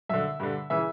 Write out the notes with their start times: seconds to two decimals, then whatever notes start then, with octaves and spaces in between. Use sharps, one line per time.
0.09 F#2 D3 E5
0.40 G2 D3
0.70 C#3 E3 E5